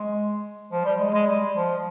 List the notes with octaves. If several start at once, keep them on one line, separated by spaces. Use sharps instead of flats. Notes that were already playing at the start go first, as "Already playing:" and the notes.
Already playing: G#3
F3
G3
G#3
G#3
G3
F3